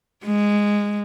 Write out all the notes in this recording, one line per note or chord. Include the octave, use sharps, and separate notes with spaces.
G#3